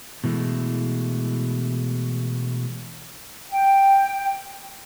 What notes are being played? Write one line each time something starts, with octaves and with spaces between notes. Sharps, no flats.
B2 E3 G#3 A3
G5